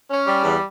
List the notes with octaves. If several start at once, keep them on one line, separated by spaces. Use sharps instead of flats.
C#4
G3
E2